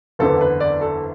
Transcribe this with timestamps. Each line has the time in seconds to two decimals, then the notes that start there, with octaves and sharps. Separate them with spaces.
0.19 F#1 E2 D3 B3 A4
0.41 B4
0.60 D5
0.81 A4